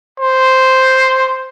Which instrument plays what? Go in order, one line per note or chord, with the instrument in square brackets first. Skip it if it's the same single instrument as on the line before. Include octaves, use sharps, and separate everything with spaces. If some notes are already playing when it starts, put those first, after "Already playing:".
[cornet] C5